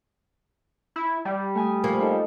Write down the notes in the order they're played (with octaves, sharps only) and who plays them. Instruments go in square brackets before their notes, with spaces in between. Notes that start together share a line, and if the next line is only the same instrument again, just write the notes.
[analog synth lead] E4
G3
[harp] A3 G#5 D#6
[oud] F3 A#3
[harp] D#4 A4